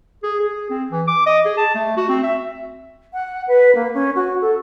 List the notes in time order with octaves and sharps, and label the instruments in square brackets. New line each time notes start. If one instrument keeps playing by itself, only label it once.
[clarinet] G#4
G#4
C4
E3
D6
D#5
G#4
A5
A3
F#4
C4
E5
[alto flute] F#5
B4
A#3
C#4
F#4
A4